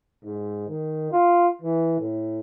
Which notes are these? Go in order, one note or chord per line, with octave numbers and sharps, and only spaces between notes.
G#2
D#3
F4
E3
A2